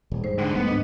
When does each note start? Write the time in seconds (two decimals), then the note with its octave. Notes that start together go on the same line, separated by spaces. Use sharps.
0.12 D#1
0.24 G#2 G3 C5
0.38 D2 G2 D3 G3 G#3
0.55 D1 A3 B3
0.67 G#2 D4 D#5